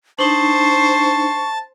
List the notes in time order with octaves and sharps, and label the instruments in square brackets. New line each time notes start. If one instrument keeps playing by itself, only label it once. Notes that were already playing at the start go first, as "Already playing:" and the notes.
[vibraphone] D4 D#4 [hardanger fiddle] C5 [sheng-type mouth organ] A5 [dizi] C#6